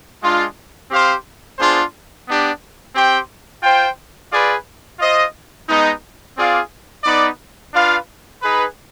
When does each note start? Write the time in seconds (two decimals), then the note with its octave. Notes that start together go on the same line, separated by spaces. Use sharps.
0.21 G#3 D4 F4
0.90 C4 G4 C5 F5
1.58 B3 D4 F4 G#4 C5
2.26 B3 D4 G4
2.94 C4 G4 C5 G5
3.62 F4 C5 G5
4.31 F4 G#4 B4 D5
4.99 F4 C5 D#5
5.68 G#3 B3 D#4
6.36 C4 F4 G#4 D5 F5
7.04 B3 D#4 B4 D5
7.73 D4 F4 B4 F5
8.42 D#4 G#4 B4